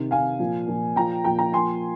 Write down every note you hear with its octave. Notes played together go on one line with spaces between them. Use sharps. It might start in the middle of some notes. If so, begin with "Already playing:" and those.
Already playing: C3 D#3
C3 D#3 F5 G#5
A#2 F3
A#2 F3
A#2 F3 G5 A#5
A#2 F3 G5 A#5
G5 A#5
A#2 F3 G#5 C6